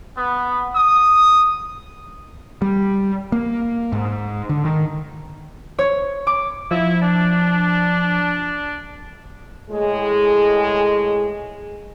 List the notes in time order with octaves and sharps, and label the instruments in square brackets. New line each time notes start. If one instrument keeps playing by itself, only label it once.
[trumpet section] B3
D#6
[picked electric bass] G3
A#3
G#2
D3
D#3
[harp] C#5
D6
[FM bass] F3 [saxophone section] E4
[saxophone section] D4
[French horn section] A2 G#3 G#4